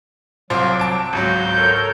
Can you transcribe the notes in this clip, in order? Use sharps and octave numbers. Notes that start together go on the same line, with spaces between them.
C2 F#3 F4 C5 D6
A5 D7
G#1 C#2 F#3 F#4 G6
A4 A#4 C#5